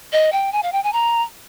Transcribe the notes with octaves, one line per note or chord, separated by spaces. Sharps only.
D#5
G5
G#5
F5
G5
G#5
A#5